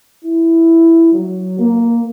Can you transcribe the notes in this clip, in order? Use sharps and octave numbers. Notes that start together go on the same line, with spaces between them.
E4
F#3
A#3